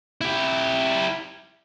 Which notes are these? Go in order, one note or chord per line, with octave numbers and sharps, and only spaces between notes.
E4 G4